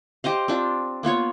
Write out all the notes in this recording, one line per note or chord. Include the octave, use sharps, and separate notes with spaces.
G4 C5 D#5 F5
C4 D4 F4
A#3 B3 F4 C#5